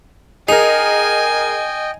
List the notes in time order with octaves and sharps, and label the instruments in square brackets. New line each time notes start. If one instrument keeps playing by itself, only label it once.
[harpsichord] D#4 [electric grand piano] G#4 A#4 [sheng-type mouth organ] D#5 G5 [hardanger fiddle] G#5